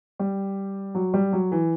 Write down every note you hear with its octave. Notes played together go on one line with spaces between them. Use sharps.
G3
F#3
G3
F#3
E3